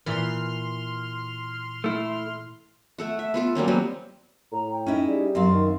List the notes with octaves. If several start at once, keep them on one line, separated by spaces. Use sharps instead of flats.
A#2 E3 C6 F6
A3 E4
A3 A4 F#5
E5
B3 F4 A4
F#3 G3 A#3 C#4
F#3 G3 B3 C4
A2 A#5
G5
C#4 D#4 E4
G3 G#4
F#2 C4 F5 C6
D#3